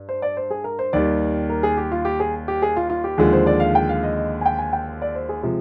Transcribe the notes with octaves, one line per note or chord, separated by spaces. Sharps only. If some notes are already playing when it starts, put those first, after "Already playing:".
Already playing: G2
C5
D5
C5
G#4
A#4
C5
D#2 D#3 G3 D5
A#4
G#4
G4
F4
G4
G#4
G4
G#4
F4
F4
G4
D#2 D3 F3 G#3 G#4
C5
D5
F5
G5
F5
D#5
D#5
G#5
G5
G#5
G5
D5
C5
G#4
C3 F3 G#3 G#4